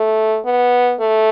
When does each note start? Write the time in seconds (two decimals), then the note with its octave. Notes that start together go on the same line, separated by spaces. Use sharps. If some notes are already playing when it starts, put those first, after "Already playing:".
Already playing: A3
0.45 B3
1.00 A3